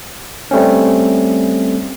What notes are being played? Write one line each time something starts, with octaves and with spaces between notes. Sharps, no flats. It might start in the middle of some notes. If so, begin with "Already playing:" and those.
G3 A3 C4 C#4